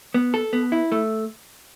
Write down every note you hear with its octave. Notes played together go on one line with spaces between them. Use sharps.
B3
A4
B3
E4
A3